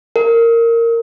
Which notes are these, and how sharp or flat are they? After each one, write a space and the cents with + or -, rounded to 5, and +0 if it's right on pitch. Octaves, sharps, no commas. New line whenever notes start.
A#4 -15